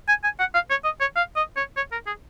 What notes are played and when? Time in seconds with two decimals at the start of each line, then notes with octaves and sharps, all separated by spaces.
0.08 G#5
0.24 G#5
0.40 F#5
0.54 F5
0.70 C#5
0.84 D#5
1.01 C#5
1.16 F5
1.36 D#5
1.56 C#5
1.77 C#5
1.92 A#4
2.07 G#4